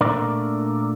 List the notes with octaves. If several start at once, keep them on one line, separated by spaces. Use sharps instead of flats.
A#2 A3 D4 A#4 D5